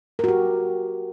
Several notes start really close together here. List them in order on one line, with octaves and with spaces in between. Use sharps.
A#4 F#4 G4